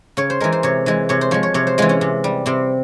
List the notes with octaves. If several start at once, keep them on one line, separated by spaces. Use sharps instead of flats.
C#3 C#5
C5
E3 G#3 A#4
C5
C3 C#5
E3 G#3
C3 C#5
C5
F3 G#3 C#5
C#5
C3 C#5
C5
E3 G#3 F4
C#4
C3
G3
C3 C4